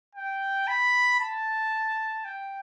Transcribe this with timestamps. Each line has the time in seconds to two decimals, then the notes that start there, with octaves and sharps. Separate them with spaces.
0.15 G5
0.68 B5
1.20 A5
2.25 G5